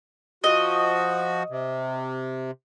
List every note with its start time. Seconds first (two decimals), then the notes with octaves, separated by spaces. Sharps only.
0.44 F3 F#4 D#5
1.50 C3